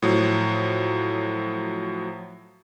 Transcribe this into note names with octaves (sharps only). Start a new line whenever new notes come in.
A2 F3 F#3